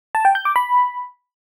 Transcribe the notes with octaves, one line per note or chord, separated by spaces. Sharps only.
A5
G5
G6
D6
B5